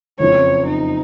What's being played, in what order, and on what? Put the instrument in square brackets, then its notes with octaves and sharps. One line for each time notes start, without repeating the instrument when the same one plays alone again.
[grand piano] F#1 F2 C#3 F3 C4 [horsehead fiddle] C#5
[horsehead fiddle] D#4